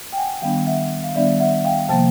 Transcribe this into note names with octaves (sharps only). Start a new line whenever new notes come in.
G5
F#5 G#5
D#3 G3 B3 D4 F5 G5
E5 F#5
F5
D#3 G3 B3 D4 D5 E5
E5 F#5
F5 G5
C3 F3 A#3 G5 A5